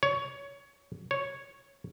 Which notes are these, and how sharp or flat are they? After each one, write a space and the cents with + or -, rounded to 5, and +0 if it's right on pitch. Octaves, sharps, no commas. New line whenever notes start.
C#5 +20
C#5 +0